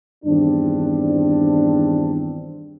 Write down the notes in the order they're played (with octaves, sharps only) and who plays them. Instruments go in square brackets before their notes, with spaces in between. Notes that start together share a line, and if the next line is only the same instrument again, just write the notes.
[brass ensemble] E2 G2 D#3 C4 D4